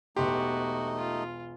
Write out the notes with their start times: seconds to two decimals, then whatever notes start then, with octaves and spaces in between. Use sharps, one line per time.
0.16 E1 B1 A3 B3 D#4 F#4 G4 C6
0.97 F4